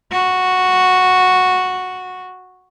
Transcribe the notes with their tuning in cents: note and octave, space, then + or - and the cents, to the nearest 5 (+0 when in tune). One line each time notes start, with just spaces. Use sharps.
F#4 -5